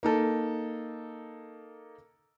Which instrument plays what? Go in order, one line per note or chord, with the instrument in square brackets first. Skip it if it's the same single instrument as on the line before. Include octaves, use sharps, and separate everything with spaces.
[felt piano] A#3 D#4 A4